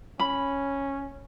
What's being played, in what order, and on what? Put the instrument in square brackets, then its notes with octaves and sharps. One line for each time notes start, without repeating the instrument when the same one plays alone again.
[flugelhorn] C#4 [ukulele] B5